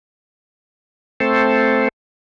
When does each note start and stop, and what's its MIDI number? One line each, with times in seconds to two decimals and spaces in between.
1.20 1.88 57
1.20 1.88 60
1.20 1.88 69
1.20 1.88 72